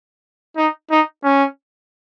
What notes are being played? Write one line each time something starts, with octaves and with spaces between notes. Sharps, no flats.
D#4
D#4
C#4